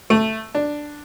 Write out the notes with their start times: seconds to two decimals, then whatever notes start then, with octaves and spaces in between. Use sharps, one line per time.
0.10 A3
0.55 D4